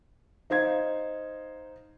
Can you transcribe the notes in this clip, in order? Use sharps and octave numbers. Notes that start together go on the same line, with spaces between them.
D#4 C5 F5 G#6